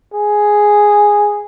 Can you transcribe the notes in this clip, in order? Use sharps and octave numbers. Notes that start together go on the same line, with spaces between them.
G#4